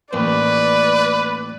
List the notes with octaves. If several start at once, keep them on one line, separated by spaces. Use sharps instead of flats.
A1 D#2 B4 D5